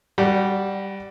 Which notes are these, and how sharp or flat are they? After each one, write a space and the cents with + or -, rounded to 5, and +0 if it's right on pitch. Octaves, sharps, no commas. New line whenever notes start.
G3 +0 F#4 +30 F#5 +0